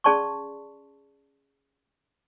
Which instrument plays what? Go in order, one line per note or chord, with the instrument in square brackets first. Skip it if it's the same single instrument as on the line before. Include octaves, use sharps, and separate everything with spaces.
[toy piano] C#4 G#4 D5 A5 C6 C#6